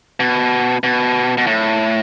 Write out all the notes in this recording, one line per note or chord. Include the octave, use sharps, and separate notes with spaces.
B2
B2
B2
A2